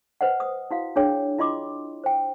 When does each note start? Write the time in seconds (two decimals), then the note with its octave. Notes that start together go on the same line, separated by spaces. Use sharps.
0.21 B4 C5 D#5 F#5
0.40 D#6
0.71 E4 F#4 F5
0.96 D4 G#4 C#5 G5
1.38 E4 F4 D#5 C6 D6
2.04 C5 G5